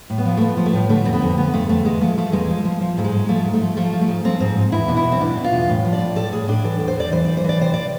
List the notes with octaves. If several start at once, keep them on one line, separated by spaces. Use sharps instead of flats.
A2
B3
F3
A3
F3 B3
F3
A3
A2
D3 A3
F2 C4
B3
F2
D3 B3
F2 A3
F2 A3
E2 G#3
F3 A3
F3 A3
E2 G#3
F3
F3
F3
G#2 A3
G#3
G#2
F3 A3
G#2
A3
F3
F3 A3
F3
A3
G#2
F3 C4
G#2 C4
G#2
E2 E4
B2 D4
E4
E2
C4
B2 D4
B2
F4
E2
A2
F3
D5
A2
A2 A4
A2 G#4
A2 D4
E3 A4
E2
C5
E2 D5
E3 C5
E3 D5
C5
E3 D5
C3 C5
D5